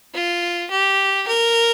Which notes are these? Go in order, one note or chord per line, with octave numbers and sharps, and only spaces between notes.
F4
G4
A#4